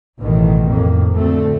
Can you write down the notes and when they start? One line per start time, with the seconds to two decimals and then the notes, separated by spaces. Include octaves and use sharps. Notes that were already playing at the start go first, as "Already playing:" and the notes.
0.20 A1 B2 D#3 E3
0.66 F2 A2 A#3
1.15 D2 A3 C4